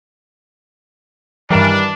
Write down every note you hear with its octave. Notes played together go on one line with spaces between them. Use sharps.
G2 D#3 E3 G3 D4 A#4